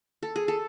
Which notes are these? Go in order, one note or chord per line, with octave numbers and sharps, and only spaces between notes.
A4
G#4
A4